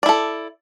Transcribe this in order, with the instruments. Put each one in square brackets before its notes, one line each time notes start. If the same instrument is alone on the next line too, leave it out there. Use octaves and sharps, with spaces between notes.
[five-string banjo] D5
E4
A4